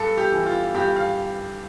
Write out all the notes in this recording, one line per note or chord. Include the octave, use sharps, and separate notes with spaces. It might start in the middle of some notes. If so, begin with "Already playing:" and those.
Already playing: G2 A4
G4
E3
F4
G2 G4
F5